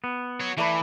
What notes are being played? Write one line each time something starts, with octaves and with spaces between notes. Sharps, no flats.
B3
F#4 C#5
E3 A3 D5 B5